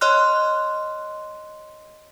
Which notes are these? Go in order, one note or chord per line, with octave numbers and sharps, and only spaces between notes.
C#5 D#5 C6 F6 F#6